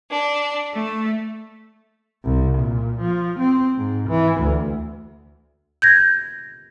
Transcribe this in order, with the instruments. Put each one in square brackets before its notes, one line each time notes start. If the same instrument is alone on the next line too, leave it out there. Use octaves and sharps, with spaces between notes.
[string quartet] D4
A3
[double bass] C2
A#2
F3
C4
G#2
E3
D2
[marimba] G6 G#6 A#6